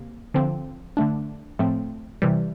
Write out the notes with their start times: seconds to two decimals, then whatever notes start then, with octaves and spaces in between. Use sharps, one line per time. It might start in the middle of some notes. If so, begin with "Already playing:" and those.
Already playing: C3 A#3
0.34 D3 F3 C4
0.97 D3 A3 D4
1.59 A2 F3 A3 C4
2.22 C3 E3 G3